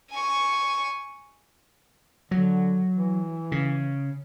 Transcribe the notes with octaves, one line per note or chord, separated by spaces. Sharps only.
G#5 C#6
D3 F#3
E3
C#3